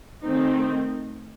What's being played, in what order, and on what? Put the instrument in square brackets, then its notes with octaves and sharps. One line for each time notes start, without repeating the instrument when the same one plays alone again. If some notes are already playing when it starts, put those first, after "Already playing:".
[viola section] D#3 A3 C4 D#4